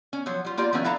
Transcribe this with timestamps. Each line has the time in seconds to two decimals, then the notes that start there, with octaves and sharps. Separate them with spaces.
0.13 C#4
0.26 F3 F#3 C#5
0.45 G3 F4
0.57 A#3 F4 G4 D5
0.72 D#3 F3 A#3 B3 C#4 E4
0.84 D4 E4 A4 F5 A5 A#5